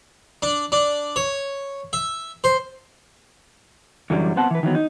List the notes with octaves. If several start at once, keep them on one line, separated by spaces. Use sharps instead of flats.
D4
D4
C#5
E5
C5
F#2 D3 E3 F#3 G3
B3 C4 F#5 A5
E3 B4
D#3 E3 F#3 B3
D#4